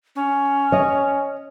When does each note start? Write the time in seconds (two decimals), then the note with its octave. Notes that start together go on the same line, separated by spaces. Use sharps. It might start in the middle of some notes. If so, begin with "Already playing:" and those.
0.16 C#4
0.72 C#5 D#5